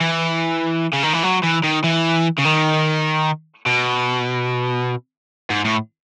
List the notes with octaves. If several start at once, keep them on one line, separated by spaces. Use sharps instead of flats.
E3
C#3
D#3
E3
F#3
E3
D#3
E3
C#3
D#3
B2
G#2
A2